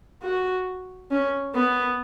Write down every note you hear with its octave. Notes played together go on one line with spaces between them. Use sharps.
F#4
C#4
B3